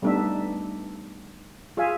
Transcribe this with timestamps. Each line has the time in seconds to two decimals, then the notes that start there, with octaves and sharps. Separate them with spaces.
0.02 G3 A3 B3 D4 D#4 E5
1.77 F4 G#4 E5 F5 G#5